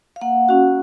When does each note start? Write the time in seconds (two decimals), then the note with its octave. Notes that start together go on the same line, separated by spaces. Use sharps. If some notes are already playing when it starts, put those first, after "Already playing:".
0.16 F5
0.21 A#3 F#5
0.49 C#4 F#4